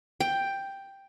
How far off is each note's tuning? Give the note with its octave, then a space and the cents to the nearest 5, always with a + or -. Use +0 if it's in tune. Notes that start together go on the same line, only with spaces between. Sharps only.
G5 +5